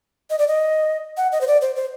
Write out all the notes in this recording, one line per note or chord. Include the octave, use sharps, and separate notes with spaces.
D#5
D5
D#5
F#5
D#5
C5
D5
C5
C5